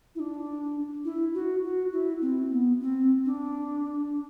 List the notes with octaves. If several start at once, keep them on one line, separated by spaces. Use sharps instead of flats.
E4
D4
E4
F#4
F#4
E4
C4
B3
C4
D4